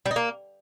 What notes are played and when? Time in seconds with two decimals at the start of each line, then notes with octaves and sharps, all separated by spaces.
0.06 G3
0.11 D#4
0.16 A#3